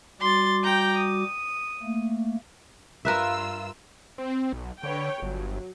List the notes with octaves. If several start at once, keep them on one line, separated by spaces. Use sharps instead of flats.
G3 F#4 C6 D6 A6
G5 A#5 G6
D#6
A3 A#3
G2 F4 A#4 B4 E5 E6
C4
B1
D3 B4 C#5 G5
G1 F#3